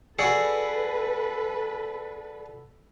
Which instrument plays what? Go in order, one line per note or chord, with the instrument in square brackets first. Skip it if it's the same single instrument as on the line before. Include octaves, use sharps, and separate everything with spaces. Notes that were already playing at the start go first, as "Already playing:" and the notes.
[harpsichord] F#4 G#4 [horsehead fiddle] A4 [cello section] B4 [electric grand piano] D5 E6 C#7